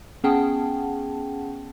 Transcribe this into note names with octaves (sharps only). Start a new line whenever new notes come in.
B3 C#4 G#4 F#5 G5 A5